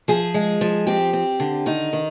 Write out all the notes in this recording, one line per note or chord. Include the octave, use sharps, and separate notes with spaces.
F3 G#4
G#3
F3
C4 G4
C4
D3
D#3 D#4
D#3